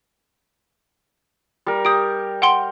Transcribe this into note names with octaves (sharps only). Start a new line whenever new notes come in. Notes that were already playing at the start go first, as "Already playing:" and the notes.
G3 A#4
G4 D#6 D7
F#5 G5 C6